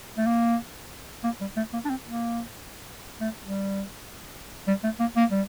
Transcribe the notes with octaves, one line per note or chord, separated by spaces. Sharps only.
A3
A#3
A#3
G3
A3
A#3
D4
C4
A#3
A3
G3
G3
A3
A#3
A#3
G3